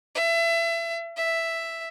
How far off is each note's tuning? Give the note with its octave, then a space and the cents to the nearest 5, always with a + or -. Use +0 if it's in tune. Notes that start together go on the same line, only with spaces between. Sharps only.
E5 +30
E5 +5